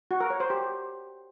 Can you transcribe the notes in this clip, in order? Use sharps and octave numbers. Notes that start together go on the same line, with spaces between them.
F#4
A#4
C#5
C5
G4